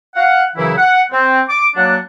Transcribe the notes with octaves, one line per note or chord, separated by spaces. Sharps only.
F5 F#5
F#2 C#3 E3 F#3 E4
F#5
C4
D6
F#3 A#3 D4 F#5